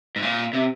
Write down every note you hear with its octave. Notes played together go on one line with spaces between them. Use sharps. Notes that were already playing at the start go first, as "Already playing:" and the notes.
G#2
A#2
C3